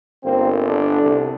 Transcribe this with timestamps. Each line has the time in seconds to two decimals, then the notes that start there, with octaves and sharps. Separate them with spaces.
0.24 G1 A#3 C4
0.65 D3 D4
1.03 C2